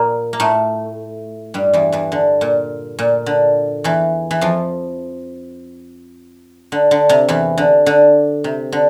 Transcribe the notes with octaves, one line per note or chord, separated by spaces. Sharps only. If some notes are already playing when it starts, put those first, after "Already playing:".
Already playing: A#2 A#3
A#3
A2 A3
G2 G3
E2 E3
E2 E3
D3
A#2
A#2
D3
E2 E3
E3
F2 F3
D3
D3
C3
E2 E3
D3
D3
C3
D3